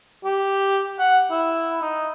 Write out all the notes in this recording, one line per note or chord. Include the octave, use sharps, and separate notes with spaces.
G4
F#5
E4
D#4